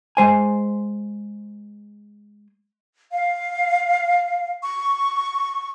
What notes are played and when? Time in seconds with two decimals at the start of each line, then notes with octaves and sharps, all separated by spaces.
0.17 G#3 C5 G#5
3.11 F5
4.62 C#6